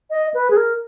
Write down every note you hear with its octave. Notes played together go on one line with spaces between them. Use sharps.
D#5
B4
G#4
A#4